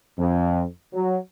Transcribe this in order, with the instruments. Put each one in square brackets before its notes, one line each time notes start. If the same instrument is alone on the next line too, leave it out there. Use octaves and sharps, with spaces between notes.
[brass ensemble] F2
F#3